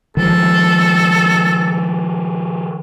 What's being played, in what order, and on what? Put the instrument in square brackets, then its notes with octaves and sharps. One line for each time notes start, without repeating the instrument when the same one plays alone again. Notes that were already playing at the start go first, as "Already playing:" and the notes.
[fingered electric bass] D#3 F3 G#3 [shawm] A4